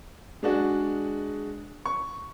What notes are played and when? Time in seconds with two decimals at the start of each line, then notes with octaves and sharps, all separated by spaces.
0.43 G#3 D4 F#4 G#4
1.85 C#6